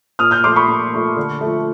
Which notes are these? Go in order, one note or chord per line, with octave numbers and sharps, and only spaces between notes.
A#2 D#6 F6
F6 G6
F3 A3 C6 D6
B5 C#6
A#2
F3 A3
D3
F3 A3